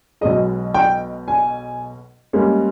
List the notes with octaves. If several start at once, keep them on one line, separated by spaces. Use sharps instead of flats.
B1 B2 G#3 D#5
G5
G#5
G#2 G3 A#3 C#4